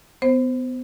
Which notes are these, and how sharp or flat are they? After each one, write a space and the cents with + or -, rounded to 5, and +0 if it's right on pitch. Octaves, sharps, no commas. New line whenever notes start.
B3 +30 C5 +0